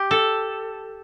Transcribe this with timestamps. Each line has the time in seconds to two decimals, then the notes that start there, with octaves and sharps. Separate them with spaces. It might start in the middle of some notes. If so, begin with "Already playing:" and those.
Already playing: G4
0.11 A4